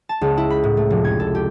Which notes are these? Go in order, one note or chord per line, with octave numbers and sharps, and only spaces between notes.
A5
C#2
E4
B5
A2
A3
F1
G#6
A4
G4